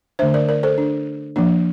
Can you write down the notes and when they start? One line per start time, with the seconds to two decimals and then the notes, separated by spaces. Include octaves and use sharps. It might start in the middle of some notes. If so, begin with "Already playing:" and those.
0.19 D3 A3 D4 C5 E5
0.34 A#4 D5
0.48 A#4 D5
0.63 A4 C5
0.78 D4
1.36 F3 A#3 D4